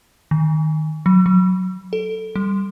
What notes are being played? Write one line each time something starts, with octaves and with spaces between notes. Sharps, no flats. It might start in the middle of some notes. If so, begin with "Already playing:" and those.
D#3
F#3
F#3
A4
G3